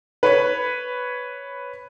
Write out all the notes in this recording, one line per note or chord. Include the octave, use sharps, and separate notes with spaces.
B4 C#5 B5